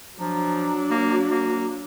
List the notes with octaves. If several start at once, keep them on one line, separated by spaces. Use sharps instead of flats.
F3 F#3 D4 A#5
A#3 F#4
A#3